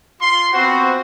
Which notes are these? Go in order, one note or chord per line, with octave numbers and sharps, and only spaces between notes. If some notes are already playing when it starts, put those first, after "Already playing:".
F4 C6
B3 C4 F4 F#4 C5 F#5